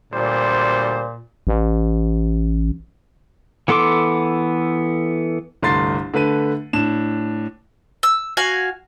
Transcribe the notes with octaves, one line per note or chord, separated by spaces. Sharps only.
D2 A#2 G3 C5
A1
E3 B3 A4 C6 D6
G1 C2 A3 C6 A6 C7
D3 A3 B4 D#7
A2 D4 E7
E6
F#4 F5 G#5